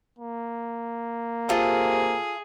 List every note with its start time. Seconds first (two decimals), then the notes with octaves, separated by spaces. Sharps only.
0.19 A#3
1.49 C3 F4 G#4 A4